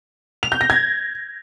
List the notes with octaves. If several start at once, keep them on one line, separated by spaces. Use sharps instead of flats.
F7
G6
A#6
G#6